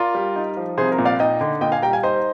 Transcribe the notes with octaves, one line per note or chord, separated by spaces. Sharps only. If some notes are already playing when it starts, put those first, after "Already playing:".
Already playing: F4 A#4 D5
G3
D#4
F3
C2 G#4 C5
A#4
A#2
D5 F5
D#4 D#5 G5
D3
A#2 D#5 G5
F5 G#5
G3 G5 A#5
F5 G#5
D#4 C5 D#5